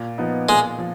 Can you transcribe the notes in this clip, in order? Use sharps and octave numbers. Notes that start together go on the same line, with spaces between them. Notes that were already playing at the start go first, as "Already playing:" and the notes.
Already playing: A#2
F3 B3 D#4
A#2 G#3
F3